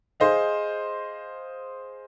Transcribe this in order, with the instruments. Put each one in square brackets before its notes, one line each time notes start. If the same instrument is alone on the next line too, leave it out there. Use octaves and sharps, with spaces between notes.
[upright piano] G#4 C5 D#5 F5